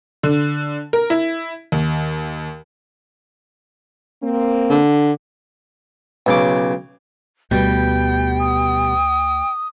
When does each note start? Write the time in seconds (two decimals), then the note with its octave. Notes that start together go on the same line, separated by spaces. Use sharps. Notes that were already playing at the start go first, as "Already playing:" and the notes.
0.23 D3
0.93 A#4
1.10 E4
1.72 D#2
4.23 A#3 C4
4.70 D3
6.26 B1 C#3 D6
7.51 D2 B2 G3 G5 G6
8.40 D#6